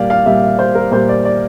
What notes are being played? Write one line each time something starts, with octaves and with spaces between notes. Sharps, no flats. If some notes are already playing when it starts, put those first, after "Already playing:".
Already playing: A#2 G3 D5 F5
F5
A#2 G3 E5
E5
C5
A#4
A#2 G3 C5
D5
D5